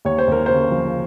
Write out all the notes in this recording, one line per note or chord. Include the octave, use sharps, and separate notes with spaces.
D#2 C#5
C5
D#2 A#4
C#3 C5
F3